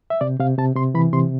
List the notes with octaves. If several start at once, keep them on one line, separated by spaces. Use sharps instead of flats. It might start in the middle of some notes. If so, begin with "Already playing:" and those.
E5
C3 D5
C3 F5
C3 A5
C3 C6
E3 B5
C3 C6